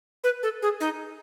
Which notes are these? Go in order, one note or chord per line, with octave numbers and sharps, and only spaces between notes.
B4
A4
G#4
D#4